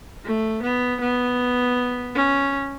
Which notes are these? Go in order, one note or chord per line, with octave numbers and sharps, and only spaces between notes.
A3
B3
B3
C#4